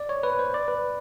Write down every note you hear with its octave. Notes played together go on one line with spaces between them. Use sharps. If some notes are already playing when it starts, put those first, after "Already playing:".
Already playing: D5
C#5
B4
C5
D5
B4